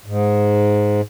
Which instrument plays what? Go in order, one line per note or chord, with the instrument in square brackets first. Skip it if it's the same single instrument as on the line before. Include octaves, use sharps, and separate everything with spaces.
[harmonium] G#2